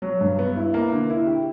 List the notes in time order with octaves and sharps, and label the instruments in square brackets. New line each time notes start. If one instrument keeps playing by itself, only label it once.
[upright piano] F#3
G2
B3
E4
A#3
D3
E4
G4